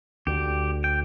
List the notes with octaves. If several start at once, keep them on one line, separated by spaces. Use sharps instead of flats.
D2 G4
G5